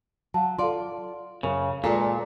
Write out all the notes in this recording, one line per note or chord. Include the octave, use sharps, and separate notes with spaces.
F#3 F5 F#5 A5
F4 A4 D5 F5 C6
F#2 C#3 A#4
A#2 G#3 F4 A4 B4 D5 F5